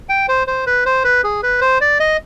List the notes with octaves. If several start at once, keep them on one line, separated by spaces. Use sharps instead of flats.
G5
C5
C5
B4
C5
B4
G#4
B4
C5
D5
D#5